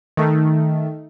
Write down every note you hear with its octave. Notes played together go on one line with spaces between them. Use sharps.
D#3 A3